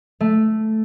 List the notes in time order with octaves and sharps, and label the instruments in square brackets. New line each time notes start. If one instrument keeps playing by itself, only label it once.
[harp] A3